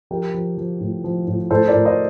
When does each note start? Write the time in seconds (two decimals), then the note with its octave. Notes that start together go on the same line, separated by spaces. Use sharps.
0.11 F3 G4 A#4
0.34 F3
0.57 F3
0.80 A2
1.04 F3
1.27 A2
1.50 A2 A4 C5
1.68 A#4 D5
1.74 A2
1.85 C5 D#5